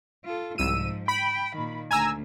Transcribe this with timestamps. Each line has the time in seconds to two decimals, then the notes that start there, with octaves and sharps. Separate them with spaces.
0.24 F4 A4
0.58 C2 G#2 F3 E6 D#7
1.08 G5 B5
1.56 A#2 D#3
1.91 D2 G#5 A#5 E6